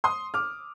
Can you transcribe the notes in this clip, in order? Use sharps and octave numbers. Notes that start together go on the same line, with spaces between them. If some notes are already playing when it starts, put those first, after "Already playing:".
C6 D#6
D6 F6